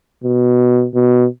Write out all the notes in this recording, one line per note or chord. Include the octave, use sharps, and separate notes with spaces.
B2
B2